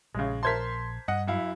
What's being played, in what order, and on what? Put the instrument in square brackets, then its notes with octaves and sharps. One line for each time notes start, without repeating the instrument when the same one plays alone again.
[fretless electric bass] A#1 [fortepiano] C#3 G#3
[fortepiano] A#4 C5 A5 [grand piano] C6 G#6 B6
[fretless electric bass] G2 [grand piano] D#5 F#5
[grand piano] F#2 E4 F5